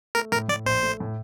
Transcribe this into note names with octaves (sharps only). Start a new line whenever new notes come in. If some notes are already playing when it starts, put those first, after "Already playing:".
A3 A#4
A2 A#4
A2 D5
A#1 C5
A3
A2